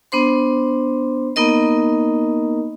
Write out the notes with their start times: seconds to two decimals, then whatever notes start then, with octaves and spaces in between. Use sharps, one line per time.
0.12 B3 D4 C5 C6
1.36 A#3 B3 D#4 A#4 D#5